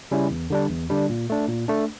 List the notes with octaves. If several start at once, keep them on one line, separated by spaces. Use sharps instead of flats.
C#3 G3 C#4 E4
E2
D3 G3 D4
E2
D3 G3 D4
A#2
A3 D4
A#2
A3 D4